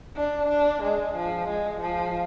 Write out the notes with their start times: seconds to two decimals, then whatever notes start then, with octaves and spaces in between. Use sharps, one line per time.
0.16 D4
0.49 D4
0.83 G#3
1.16 F3
1.49 G#3
1.81 F3